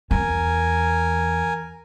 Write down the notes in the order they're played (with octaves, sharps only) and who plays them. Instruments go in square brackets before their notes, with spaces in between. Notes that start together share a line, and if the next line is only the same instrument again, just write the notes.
[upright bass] E2 [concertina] A#4 G#5